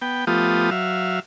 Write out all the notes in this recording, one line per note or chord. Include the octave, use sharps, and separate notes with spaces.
B3 G5
F3 A3 B3 F4 G4 D#6
F#3 E5 F5